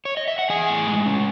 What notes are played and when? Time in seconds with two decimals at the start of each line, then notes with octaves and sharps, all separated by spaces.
0.05 C#5
0.17 D#5
0.28 E5
0.39 F#5
0.50 E3 G#4 G#5
0.69 A2
0.87 G#3
1.06 C#4